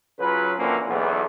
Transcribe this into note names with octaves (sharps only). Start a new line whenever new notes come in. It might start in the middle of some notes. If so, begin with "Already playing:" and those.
C#3 F#3 F4 B4
D3 E3 F3 A#3 C4 C#4
B1 E2